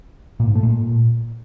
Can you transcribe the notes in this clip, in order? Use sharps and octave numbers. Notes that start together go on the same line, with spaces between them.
A#2
G#2
A3
A#2